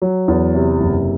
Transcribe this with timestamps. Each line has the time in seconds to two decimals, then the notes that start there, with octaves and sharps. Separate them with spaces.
0.02 F#3
0.28 E2
0.54 C3
0.80 F#1